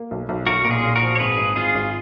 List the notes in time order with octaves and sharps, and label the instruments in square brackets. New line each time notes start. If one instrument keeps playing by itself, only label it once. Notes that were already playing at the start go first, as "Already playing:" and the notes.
Already playing: [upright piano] A#3
B1
B1
[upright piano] B1 [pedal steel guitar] F#4 A#4
[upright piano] A#2 [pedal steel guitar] A#4
[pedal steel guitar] F4 G#4
[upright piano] A#2
[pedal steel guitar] F#4 A#4
[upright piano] F3
[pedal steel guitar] C#5
[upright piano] G#1 [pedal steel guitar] G#4 B4
[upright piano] G#1
[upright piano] G#1 [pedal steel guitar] F4 G#4
[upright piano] G#1